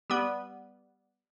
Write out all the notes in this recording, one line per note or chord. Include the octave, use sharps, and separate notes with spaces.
G3 B3